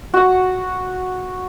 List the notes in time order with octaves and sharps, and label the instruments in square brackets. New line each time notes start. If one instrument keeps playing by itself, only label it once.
[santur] F#4 F#5